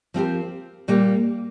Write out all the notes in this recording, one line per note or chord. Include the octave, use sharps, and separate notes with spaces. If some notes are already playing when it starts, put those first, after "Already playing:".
F3 C4 G4 A#4
A#2 G3 A#3